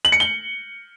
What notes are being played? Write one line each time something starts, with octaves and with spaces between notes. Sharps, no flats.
F#7
C#7
G7